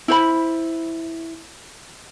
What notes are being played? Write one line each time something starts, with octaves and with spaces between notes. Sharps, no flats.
E4 C5 B5